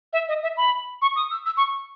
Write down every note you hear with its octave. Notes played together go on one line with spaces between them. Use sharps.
E5
D#5
E5
B5
C#6
D#6
E6
E6
C#6